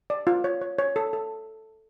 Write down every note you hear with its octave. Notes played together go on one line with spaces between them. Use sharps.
D5
F4
C#5
C#5
C#5
A4
A4